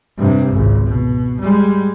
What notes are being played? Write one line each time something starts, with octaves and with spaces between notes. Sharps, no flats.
G2 C3
G#1 C#2
B2
G3 G#3